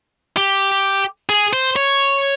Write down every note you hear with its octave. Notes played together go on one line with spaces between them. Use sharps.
G4
G#4
C5
C#5